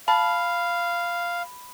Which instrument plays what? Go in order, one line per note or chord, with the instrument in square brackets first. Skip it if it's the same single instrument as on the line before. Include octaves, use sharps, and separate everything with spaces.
[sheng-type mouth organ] F5 [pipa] A5 [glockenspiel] B5